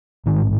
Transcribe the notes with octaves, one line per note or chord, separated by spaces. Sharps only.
A1 G#2 D#3